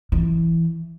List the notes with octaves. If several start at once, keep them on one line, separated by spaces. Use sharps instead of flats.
E3